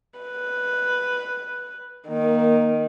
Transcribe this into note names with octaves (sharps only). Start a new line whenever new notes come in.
B4
D#3 A#3